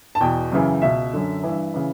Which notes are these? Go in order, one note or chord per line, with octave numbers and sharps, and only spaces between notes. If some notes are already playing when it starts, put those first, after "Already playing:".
A5
E2 B2 G5
F#2 C#3 E3
C#2 B2 E5
F#2 D3
G2 E3
C#3 E3